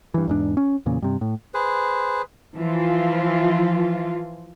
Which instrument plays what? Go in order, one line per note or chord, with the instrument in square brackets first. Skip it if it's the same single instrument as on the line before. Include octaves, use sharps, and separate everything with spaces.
[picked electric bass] G2 E3
E2 G#2 D4
C#4
E2 A#2 C#3
G2 C3
A2
[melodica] G#4 B4 C5
[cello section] E3 F3 F4